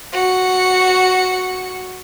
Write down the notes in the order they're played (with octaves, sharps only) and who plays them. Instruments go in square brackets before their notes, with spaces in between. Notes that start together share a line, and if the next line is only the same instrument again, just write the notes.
[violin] F#4 C#7